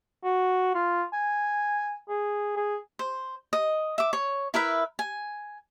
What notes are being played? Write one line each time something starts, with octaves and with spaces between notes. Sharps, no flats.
F#4
F4
G#5
G#4
G#4
C5
D#5
E5 D6
C#5
E4 A#4 B4 E5
G#5